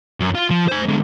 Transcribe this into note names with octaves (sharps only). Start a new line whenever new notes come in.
F#2
F4
F3
C5 G#5
G#2 D3